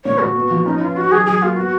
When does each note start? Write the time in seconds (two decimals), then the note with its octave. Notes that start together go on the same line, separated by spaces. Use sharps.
0.05 A#2 C#5
0.20 A#2 F#4
0.36 B3
0.50 F3
0.66 C#4 D#4
0.81 F4 B4
0.96 D#4 F#4
1.12 F#3 G#4
1.26 F#3 G#4
1.42 A#3 F4
1.56 B3 F#4